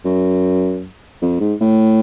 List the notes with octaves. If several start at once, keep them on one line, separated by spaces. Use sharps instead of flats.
F#2
F2
G#2
A2